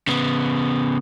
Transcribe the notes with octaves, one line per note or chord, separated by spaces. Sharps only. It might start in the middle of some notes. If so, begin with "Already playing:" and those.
C#3 B3